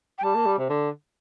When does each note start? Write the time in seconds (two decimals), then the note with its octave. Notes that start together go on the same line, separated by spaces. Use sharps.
0.18 G5
0.23 G3 A5
0.35 A#3
0.46 G3
0.58 C3
0.69 D3